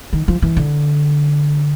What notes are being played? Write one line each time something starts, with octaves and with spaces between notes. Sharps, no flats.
D#3
F3
E3
D3